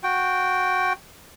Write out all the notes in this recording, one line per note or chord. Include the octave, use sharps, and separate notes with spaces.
F#4 G5